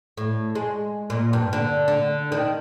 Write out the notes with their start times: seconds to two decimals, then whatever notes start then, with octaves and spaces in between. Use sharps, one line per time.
0.17 A2
0.55 G#3
1.10 A#2
1.33 G2
1.53 D3
1.88 D3
2.32 D#3